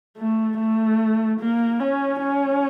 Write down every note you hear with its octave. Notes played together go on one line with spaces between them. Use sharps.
A3
A3
A#3
C#4
C#4